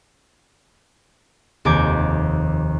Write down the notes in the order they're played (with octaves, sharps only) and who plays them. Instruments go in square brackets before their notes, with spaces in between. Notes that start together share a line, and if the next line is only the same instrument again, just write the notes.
[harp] F1 D#2 D6 G6 G#6